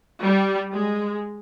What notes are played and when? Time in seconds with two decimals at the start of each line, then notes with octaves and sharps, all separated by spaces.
0.24 G3
0.72 G#3